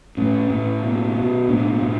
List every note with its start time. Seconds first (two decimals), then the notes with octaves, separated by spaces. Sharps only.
0.17 A2 C#4
0.50 A2
0.82 B2
1.16 B2
1.48 A2 D4
1.82 A2